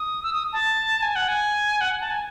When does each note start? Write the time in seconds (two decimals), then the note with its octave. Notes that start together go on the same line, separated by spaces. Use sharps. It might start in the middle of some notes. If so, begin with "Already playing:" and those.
Already playing: D#6
0.23 E6
0.33 D#6
0.53 A5
1.02 G#5
1.16 F#5
1.28 G#5
1.81 F#5
2.00 A5
2.10 G#5